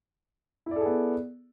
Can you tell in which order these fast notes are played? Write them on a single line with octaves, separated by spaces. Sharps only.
E4 D5 A4 G#4 B3